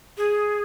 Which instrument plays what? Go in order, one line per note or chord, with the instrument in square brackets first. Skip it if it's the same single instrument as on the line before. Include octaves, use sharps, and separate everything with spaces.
[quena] G#4